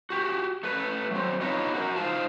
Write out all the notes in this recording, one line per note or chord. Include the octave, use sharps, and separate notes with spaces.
F#4 G4
A3 B4
F#3 C4
D4 D#4 F4 B4 C#5 D#5
F#4 A#4
D#4 F4 C5 F5 A5